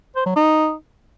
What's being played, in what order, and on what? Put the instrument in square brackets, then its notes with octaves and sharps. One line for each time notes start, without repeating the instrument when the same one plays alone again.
[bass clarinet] C5
F#3
D#4